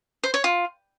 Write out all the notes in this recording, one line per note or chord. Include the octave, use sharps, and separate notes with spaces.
C5
C#5
F4